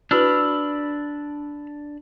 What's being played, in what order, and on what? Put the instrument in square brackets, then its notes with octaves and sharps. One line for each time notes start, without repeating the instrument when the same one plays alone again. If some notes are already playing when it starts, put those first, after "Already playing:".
[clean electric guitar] D4 [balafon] E4 F#4 B4 [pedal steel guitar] B5 E6 F6